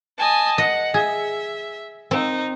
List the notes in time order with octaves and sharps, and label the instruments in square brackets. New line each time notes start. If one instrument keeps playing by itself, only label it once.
[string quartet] D#5 G#5 A5
[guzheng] D#5 [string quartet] F#5
[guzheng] G#4 [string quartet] E5
[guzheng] C4 [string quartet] D#4